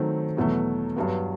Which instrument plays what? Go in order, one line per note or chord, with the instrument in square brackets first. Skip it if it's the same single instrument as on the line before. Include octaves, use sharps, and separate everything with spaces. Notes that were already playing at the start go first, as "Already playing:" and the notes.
Already playing: [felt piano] D#3 F#3 A3 C4
E2 B2 F#3 A3
G2 F#3 B3